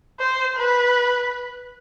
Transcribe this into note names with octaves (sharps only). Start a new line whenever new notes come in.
C5
B4